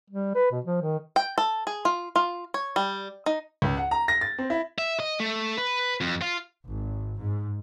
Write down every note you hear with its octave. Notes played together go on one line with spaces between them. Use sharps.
G3
B4
B2
F3
D#3
G5
A4
G#4
F4
F4
C#5
G3
D#4
C#2
F#5
A#5
A#6
A6
C4
E4
E5
D#5
A3
B4
F2
F4
G#1
G#2